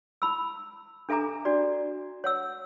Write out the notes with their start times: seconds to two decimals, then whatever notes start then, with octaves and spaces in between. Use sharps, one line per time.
0.22 E4 B5 E6
1.09 D4 A4 E5 G#5 A#5 D6
1.45 D4 F#4 D5
2.24 C#5 F#5 E6